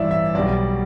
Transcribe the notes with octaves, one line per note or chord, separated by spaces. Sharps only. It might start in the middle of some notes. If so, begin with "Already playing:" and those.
Already playing: A1 G2 E3 D5 E5
E5
B1 B2 G3 D5